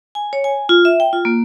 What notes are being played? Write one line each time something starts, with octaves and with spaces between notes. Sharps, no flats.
G#5
C#5
G#5
F4
E5
G5
F4
A#3